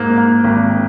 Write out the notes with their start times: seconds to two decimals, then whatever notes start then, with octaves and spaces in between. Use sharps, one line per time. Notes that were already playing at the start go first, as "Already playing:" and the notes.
Already playing: G#2 A#3
0.18 A#3
0.44 G#1